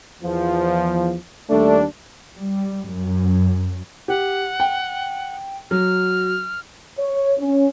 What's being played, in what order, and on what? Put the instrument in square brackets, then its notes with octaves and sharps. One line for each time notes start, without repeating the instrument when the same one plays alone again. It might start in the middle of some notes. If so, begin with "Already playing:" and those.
[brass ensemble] E2 F3
[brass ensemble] D#2 G3 D4 [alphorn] A3
[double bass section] G3
F#2
[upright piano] G4 [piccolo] F#5
[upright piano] G5
[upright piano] F#3 [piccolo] F6
[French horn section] C#5
C#4